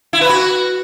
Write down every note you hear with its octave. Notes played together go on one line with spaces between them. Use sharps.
E4
B4
F#4